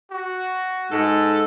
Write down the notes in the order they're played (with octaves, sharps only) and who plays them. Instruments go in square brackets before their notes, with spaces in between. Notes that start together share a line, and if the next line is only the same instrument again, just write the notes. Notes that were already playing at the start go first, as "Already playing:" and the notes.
[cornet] F#4
[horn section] G#2 G#3 A4